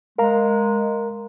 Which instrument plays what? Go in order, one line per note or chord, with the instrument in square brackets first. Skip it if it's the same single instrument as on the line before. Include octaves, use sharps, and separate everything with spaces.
[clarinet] G#3 [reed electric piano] A#4 F5 A#5